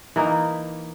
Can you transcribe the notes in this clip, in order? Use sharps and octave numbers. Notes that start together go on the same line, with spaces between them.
E3 A#3 D#4